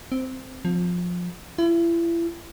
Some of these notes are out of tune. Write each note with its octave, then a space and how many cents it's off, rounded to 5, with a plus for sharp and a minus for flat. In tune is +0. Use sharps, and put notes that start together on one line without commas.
C4 -10
F3 +20
E4 +35